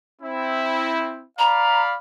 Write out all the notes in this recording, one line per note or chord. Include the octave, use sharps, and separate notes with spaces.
C4 E4
D5 F5 A#5 B5